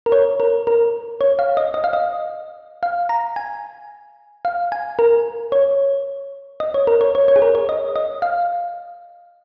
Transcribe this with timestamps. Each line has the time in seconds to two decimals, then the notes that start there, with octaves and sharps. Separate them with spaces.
0.06 A#4
0.12 C#5
0.40 A#4
0.67 A#4
1.21 C#5
1.39 F5
1.57 D#5
1.74 D#5
1.84 F5
1.93 D#5
2.83 F5
3.09 A#5
3.36 G#5
4.45 F5
4.72 G#5
4.99 A#4
5.52 C#5
6.60 D#5
6.74 C#5
6.87 A#4
7.01 C#5
7.15 C#5
7.28 C#5
7.36 G#4
7.42 A#4
7.55 C#5
7.69 D#5
7.96 D#5
8.22 F5